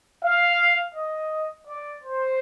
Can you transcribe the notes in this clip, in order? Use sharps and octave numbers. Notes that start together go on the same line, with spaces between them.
F5
D#5
D5
C5